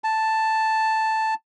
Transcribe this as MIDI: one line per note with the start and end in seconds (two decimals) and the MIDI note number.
0.04 1.34 81